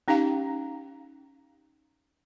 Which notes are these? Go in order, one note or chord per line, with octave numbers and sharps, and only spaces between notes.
C#4 D#4 G4 F5 A#5